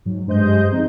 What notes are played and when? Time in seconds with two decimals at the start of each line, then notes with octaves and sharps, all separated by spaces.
0.05 G#2 F#3
0.27 G2 G#3 C5 D#5 G6
0.71 D#3 F3 C4 D#4